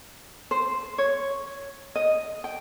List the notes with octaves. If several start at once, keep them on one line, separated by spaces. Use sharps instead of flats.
C5
C#5
D#5
G5